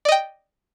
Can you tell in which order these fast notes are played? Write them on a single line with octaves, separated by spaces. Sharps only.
D5 D#5 G5